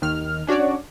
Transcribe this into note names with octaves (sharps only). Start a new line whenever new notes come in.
D#2 D#3 F6
C#4 D4 F#4 C#5 D5